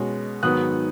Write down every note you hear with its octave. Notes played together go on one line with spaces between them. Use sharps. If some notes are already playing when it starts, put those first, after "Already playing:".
Already playing: B2 G#3 C#4
G#2 D#3 F#3 B3 D#6 F#6